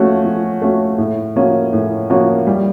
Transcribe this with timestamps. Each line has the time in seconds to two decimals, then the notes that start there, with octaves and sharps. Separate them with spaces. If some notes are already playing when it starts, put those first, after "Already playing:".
Already playing: F3 A3 C#4 F#4
0.24 F3
0.62 A3 C#4 F#4
0.98 A2
1.36 F3 A#3 C#4 F#4
1.73 A2
2.10 F3 A#3 C#4 F#4
2.47 G3